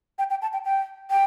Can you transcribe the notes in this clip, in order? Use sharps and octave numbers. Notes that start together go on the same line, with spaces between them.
G5
G5
A5
G5
G5
G5